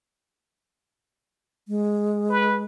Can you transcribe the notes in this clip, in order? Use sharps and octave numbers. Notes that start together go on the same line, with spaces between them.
G#3
B4